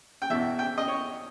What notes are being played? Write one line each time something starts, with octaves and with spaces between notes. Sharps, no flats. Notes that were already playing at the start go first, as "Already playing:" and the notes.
G5
E2 B2 E5
G5
D#5
C#5